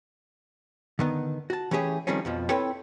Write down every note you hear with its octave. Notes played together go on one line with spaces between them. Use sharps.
D3 D#3 B3
F#4 A5
E3 A3 C#4 G4 G#4
D#3 F3 G3 A3 C4 C#4
F2 B2 F3
C4 E4 A4 B4 C#5 G5